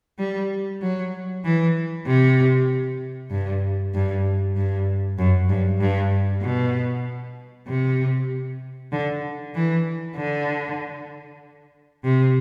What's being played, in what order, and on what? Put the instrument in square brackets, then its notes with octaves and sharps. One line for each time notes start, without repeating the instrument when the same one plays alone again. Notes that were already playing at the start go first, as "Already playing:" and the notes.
[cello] G3
F#3
E3
C3
G2
G2
G2
F#2
G2
G2
B2
C3
D3
E3
D3
C3